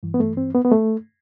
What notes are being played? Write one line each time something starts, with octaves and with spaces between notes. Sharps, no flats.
G2 E3
B3
A3
C4
B3
B3
A3